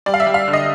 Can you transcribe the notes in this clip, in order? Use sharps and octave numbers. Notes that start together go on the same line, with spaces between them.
G3 D5
F5
E5
G3
F5
D3
D#5